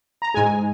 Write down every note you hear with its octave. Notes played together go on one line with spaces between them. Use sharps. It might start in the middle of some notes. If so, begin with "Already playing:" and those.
A#5
G#2 G#3 G#5